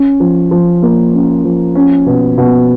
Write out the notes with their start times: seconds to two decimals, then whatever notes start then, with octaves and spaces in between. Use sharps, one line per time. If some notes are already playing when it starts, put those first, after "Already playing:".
Already playing: C#4
0.20 F3
0.51 F3
0.82 A#3
1.13 C#4
1.44 F3
1.75 C#4
2.06 B2
2.38 B2